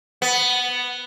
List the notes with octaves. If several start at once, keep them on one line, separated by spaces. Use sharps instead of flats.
B3